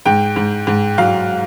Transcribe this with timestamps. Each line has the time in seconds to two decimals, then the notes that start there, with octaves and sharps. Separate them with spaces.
0.06 G#2 G5
0.36 G#2
0.67 G#2
0.98 F#3 F5